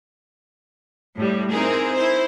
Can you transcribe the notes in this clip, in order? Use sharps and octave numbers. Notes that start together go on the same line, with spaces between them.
A2 G3
C4 D#4 E4 G#4 A#4
E4 C5